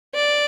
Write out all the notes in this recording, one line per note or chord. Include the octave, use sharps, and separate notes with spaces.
D5